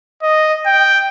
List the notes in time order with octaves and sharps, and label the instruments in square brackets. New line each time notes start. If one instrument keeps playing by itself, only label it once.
[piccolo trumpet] D#5
G5